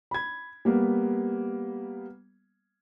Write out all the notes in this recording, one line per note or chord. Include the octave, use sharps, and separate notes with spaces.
B5 G#6
G3 A#3 B3